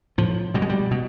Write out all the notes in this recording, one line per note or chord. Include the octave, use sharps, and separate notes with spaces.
A2 F3
B2 G3
G#3
G3
B2